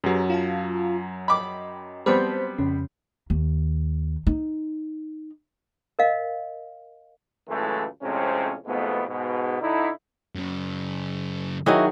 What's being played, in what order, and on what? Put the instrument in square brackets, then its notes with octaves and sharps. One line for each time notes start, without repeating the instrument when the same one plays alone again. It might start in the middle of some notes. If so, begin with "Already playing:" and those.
[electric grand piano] F#2 F#3 [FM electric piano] G4 G#4 B4
[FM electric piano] F4 F5 A5
[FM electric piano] D#5 G5 [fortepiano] B5 D6
[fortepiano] G3 B3 C4 [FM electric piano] C5 A5 G6
[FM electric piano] F2 C#3 C#4
[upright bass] D#2
D#4
[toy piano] A#4 D#5 F5
[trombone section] C#2 F#2 A2 E3 G#3 A3
F2 A2 C3 G#3 C4 C#4
F2 G#2 B2 A3 B3
G#2 B2
D3 D#4 E4
[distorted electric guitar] F#2 C#3
[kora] D#3 F#3 G#4 [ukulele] E4 F#4 D#5